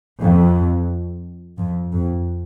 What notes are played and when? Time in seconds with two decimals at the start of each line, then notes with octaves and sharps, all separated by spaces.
0.19 F2
1.58 F2
1.92 F2